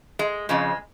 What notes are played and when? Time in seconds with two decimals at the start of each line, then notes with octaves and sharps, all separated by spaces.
0.19 G#3
0.49 F2 C#3 F3 G#3